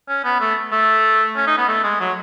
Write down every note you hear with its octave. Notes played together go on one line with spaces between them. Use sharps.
C#4
B3
A3
A3
C#4
D#4
B3
A3
G#3
F#3